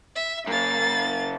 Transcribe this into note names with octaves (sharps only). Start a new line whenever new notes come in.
E5
F#2 C#3 A#3 A6